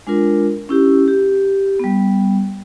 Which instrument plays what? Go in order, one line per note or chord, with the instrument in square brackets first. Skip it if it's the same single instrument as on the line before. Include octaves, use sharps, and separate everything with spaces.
[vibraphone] G#3 D4 F4 A#4
C#4 E4 G4
G4
G3 B3